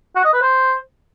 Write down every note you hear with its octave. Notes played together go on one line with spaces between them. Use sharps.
F#4
D#5
B4
C5